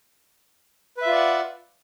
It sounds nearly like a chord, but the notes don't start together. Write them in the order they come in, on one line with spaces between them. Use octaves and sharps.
B4 E5 F4 D5 F#5